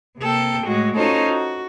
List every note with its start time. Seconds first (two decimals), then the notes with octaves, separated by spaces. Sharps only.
0.18 C3 A#3 A4 G5
0.64 A2 G#3 F#4
0.96 C#4 D#4 F4 F#4 A4 C5
1.26 F#4